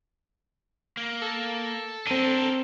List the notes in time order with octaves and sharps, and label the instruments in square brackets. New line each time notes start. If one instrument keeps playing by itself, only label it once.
[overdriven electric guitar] A#3
[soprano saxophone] A4
[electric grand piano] C4 D#7 [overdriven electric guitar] D4 A#4